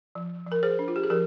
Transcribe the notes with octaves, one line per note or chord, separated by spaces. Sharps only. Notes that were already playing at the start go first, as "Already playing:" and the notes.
F3
F3
A#4
G#4 C5
D4
F4
G4
G#4
F3 G4 A#4